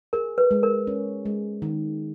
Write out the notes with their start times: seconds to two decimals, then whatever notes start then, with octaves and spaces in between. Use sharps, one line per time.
0.13 G#4 A#4
0.38 B4
0.51 G#3
0.63 A#4
0.87 C#4
1.26 G#3
1.62 D#3